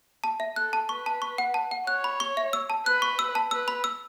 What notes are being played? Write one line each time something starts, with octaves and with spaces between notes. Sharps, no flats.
A5
E5
A4 F#6
A5
B4 C#6
A5
C#6
F#5
A5
F#5
C#5 F#6
B5
C#6
E5
E6
A5
B4 F#6
C#6
E6
A5
B4 E6
B5
E6